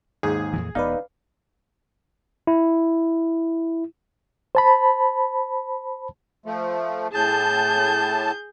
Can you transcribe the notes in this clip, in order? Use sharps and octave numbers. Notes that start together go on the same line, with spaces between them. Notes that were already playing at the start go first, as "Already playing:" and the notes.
D#2 G#2 G#4
F2 A#2 E3
E1 B3 D#4 B4 D5 F5
E4
C5 A5 B5
F3 A3
A2 G#4 A5 G6